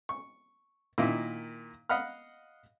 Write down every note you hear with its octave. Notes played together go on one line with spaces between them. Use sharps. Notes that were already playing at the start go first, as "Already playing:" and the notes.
C#6
A#2 D#3 A#3 D#4 E4
D#5 F5 F#5 B5 F6